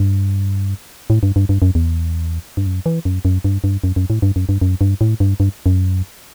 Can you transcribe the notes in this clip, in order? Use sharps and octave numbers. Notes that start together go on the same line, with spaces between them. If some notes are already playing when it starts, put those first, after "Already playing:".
Already playing: G2
A2
G2
G2
G2
F#2
E2
G2
F#2
E3
F#2
F#2
G2
G2
F#2
F#2
A2
G2
F#2
G2
F#2
G2
A2
G2
G2
F#2